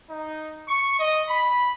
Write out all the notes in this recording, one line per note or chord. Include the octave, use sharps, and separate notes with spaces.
D#4
C#6
D#5
B5